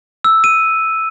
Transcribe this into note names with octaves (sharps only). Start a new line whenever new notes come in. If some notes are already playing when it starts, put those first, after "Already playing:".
E6
D#7